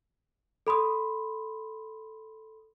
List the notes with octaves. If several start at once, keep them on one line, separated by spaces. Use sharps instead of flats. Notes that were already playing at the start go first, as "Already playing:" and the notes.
A4 B5 C6 D#6